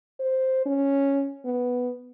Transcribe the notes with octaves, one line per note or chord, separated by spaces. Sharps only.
C5
C#4
B3